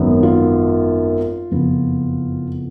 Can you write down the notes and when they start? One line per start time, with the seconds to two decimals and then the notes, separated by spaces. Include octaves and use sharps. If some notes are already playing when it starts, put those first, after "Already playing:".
Already playing: G#1 F#2 D#3 F#3 B3
0.23 F4
1.51 F#1 F2 F3 B3